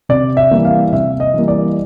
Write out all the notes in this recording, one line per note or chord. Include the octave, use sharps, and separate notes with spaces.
C3 D5
E5
E3 G3 A#3
F5
C3 E5
D#5
E3 G3 A#3
D5